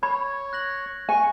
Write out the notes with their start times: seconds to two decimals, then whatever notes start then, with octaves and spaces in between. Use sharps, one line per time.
0.03 C#5 B5 G#6
0.53 F#6 A#6 F#7
1.09 G#5 C#6